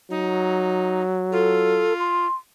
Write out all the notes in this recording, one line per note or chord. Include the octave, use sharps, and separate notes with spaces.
F#3 D#4
F4 A4
C6